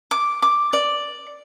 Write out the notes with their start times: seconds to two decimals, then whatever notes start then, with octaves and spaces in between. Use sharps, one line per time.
0.11 D6
0.42 D6
0.73 D5